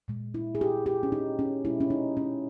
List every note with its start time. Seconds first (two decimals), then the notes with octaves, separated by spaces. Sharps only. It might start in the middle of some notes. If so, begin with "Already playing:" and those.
0.08 A#2 G#3
0.34 E4
0.55 G#4
0.61 G4
0.86 G4
1.03 C#4
1.12 D#4
1.39 C#4
1.65 B2 G#3 E4
1.81 C#4
1.90 D#4
2.17 C#4